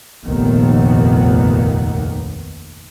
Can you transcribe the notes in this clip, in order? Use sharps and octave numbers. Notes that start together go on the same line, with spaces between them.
F1 A#1 D#2 D#3 B3